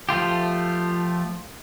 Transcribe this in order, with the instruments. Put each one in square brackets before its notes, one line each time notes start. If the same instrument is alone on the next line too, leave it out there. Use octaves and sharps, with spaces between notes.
[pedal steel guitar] F3 A3 F4 G4